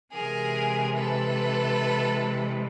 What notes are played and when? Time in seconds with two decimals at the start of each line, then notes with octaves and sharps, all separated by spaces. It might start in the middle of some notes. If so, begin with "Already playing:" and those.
0.13 C3 E3 G#3 G#4 A#4
0.96 A4 B4